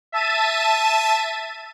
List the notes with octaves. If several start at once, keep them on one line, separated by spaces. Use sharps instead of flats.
E5 A5 D#7